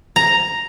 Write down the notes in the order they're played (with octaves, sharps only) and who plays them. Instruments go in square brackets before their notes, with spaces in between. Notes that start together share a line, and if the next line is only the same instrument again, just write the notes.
[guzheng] A#5